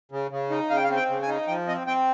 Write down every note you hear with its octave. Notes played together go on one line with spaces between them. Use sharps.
C#3
C#3
D#4
C#3 F5
G5
F5
C4
G5
C#3
G#5
D#4
F3 G5
C4 D#5
C4 G5